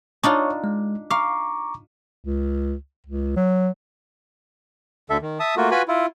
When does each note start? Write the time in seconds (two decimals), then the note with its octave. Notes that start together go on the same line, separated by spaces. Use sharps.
0.24 D4 D#4 F4 C#5 C#6
0.64 G#3
1.11 F5 A#5 C#6 D6
2.24 C#2
3.06 C#2
3.36 F#3
5.10 D2 D3 A4 E5
5.22 D#3
5.40 E5 A5 D#6
5.57 A3 A#3 F4 F#4
5.71 F4 F#4 B4 G#5 B5
5.88 E4 F4